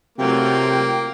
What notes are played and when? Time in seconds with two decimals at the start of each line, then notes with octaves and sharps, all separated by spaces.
0.18 C3 F#3 A3 A#3 F4 G5